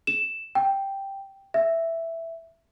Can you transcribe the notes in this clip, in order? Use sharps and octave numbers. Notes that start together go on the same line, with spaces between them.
E7
G5
E5